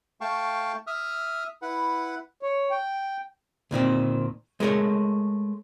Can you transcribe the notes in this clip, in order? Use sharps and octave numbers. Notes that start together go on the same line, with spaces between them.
A3 F5 G5 A5 C#6
E5 D#6 F6
E4 B4 F#5
C#5
G5
D2 A#2 D#3 C4
G#3 A3 A#4 C#5